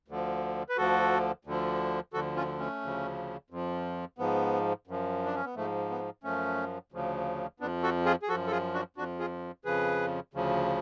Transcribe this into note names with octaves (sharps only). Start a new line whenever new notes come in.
D2 D3 F3
B4
D2 D3 F3 F#4 A4
D2 D3 F3
D2 D3 F3 F#4 A4
C#4 F4
A3 C#4
D2 C#3 F3
F2 F3
G#2 F3 B3
F#2 F3
D4
C#4
B3
G#2 F3 A3
B3
F#2 F3 A3 C#4
D2 C#3 F3
F2 F3 B3 D4
F#4 A4
F4 G#4
G#4
F#2 F3 F#4 A4
A4
F4 G#4
D4 F#4
F2 F3 D4 F#4
F4 G#4
F2 C#3 F3 G#4 B4
D2 C#3 F3